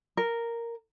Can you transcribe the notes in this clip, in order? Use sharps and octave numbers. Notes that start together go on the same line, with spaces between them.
A#4